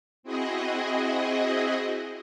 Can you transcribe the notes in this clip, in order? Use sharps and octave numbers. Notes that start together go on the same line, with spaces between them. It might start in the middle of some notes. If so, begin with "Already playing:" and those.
C4 E4 F#4 G#4 D#5